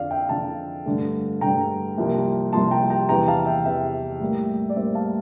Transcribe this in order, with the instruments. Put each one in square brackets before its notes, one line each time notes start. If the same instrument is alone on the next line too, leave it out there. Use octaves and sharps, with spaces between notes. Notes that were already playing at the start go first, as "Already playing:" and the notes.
Already playing: [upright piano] F2 D3 F3 D5 F5
E5 G5
F2 D3 F3 F5 A5
G2 D3 A3
G2 D3 A3 G5 A#5
C2 C3 F3 A#3
C2 C3 F3 A#3 A5 C6
G5 A#5
G5 A#5
E2 C3 E3 G5 A#5
F5 A5
E5 G5
E2 C3 E3 E5 G5
A2 G3 A#3
D5
A2 G3 A#3 C5 E5
F5 A5